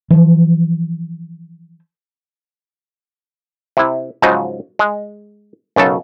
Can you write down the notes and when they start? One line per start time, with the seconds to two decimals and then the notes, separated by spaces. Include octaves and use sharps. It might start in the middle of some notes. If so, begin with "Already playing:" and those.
0.11 E3 F3
3.77 C3 E4
4.22 G#2 C#3 F3 F#3 D#4
4.79 G#3
5.76 B1 F#2 C#3 A4